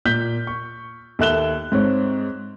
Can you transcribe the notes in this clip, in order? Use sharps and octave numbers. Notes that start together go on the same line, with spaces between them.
A#2 G6 B6 G7
C#6
D#2 A4 E5 F#6 E7 G7
G#2 C4 C#5